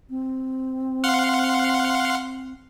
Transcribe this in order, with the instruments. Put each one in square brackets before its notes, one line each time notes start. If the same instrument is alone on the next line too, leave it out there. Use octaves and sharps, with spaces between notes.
[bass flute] C4
[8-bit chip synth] F5 F#5 C6